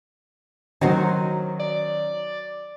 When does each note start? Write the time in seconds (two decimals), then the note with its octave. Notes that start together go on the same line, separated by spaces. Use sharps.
0.81 D#3 F#3 C#4 F#4 C5
1.59 D5